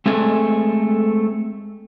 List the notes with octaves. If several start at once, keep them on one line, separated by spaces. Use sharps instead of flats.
G#3 A3 C4 G#4 A4 G#5